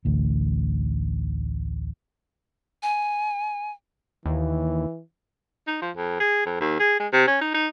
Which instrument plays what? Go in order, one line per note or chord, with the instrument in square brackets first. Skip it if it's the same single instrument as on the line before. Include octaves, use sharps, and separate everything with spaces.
[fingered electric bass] A1 D2
[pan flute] G#5
[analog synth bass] D#2 [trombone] E3
[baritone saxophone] D#4
F3
F2
G#4
F2
D#2
G#4
G#3
C3
C#4
D#4
D#4